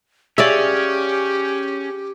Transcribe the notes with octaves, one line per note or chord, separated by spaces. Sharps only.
C#4 G4 G#4 C#5 D5 E5 F5